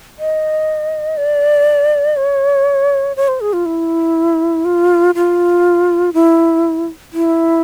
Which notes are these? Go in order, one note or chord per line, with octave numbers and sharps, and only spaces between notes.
D#5
D5
C#5
C#5
C5
G#4
F4
E4
F4
F4
E4
E4